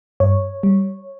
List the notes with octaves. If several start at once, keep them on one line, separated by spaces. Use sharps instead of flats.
G2 C#5
G3